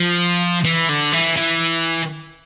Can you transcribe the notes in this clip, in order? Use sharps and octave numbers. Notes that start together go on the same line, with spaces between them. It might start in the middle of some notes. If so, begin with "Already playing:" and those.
Already playing: F3
E3
D3
E3
E3